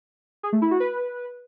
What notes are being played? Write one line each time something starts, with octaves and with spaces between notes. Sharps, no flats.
G#4
A3
E4
F#4
B4